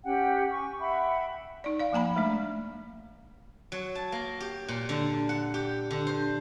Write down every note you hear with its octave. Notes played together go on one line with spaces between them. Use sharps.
C#4 G4 F#5 G5
G#5 C#6
E5 F#5 G5 B5
D#4 D5
D5 F5
F3 A#3 G#5 A#5 B5
G#3 A3 D4
F#3
A5
A#3
G4
A#2
D3
F#5
G4
D3
C5